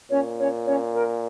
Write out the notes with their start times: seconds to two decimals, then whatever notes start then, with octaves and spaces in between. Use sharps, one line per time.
0.10 A#2 C#4 C#5
0.39 C#4 C#5
0.66 C#4 C#5
0.95 A#4